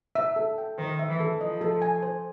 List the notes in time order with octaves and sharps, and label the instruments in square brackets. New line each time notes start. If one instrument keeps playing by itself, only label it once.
[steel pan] E5
A4
G5
[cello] D#3 [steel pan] C5
[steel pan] E5
[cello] E3
[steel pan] A4
[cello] F3 [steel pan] D#5
[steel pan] A4
G#5
C5